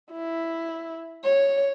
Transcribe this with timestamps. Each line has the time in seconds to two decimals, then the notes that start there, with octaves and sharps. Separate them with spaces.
0.12 E4
1.24 C#5